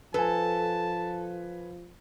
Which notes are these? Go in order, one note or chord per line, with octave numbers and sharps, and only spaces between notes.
F3 A4 B4 G#5 A5